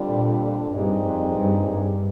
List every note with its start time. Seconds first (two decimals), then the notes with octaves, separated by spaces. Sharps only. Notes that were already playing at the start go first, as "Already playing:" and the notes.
Already playing: F2 D3 G3 D4 F4
0.10 A#2
0.73 G2 A#2 G3 C4 D#4 G#4
1.05 F2
1.37 G2
1.68 G2